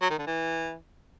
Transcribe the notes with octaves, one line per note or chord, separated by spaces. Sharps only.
F#3
D#3
D3
E3